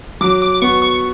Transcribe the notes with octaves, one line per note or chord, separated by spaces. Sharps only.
F#3 D6
D6
B3 F#4 C#6
C#6